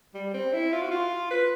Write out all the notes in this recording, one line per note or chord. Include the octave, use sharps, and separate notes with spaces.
G3
C4
E4
F4
F#4
F4
B4